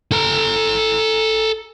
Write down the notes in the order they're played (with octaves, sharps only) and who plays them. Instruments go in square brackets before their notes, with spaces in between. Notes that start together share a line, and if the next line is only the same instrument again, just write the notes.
[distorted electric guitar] A4 A#5